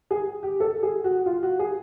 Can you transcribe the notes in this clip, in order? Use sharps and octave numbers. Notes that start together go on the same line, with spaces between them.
G#4
G4
A4
G#4
F#4
F4
F#4
G#4